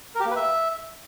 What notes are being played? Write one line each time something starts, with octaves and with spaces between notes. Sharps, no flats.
A#4
G4
A#3
B4
E5